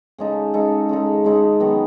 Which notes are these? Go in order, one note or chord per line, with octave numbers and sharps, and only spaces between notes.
C#3 G#3 D#4 A4
C#3 G#3 D#4 A4
C#3 G#3 D#4 A4
C#3 G#3 D#4 A4
D#3 F#3 B3